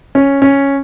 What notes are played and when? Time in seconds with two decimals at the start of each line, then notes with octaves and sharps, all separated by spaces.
0.15 C#4
0.42 C#4